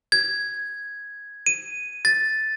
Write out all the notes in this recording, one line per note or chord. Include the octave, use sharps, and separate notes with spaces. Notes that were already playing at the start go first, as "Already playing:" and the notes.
G#6
D#7
A6